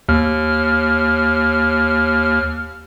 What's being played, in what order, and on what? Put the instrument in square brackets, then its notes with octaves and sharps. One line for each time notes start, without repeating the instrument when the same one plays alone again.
[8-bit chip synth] D#2 F6